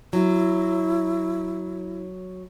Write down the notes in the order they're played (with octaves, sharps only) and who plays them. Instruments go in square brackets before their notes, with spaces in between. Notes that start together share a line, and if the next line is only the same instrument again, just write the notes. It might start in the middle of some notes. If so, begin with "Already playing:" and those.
[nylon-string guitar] F#3 [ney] E4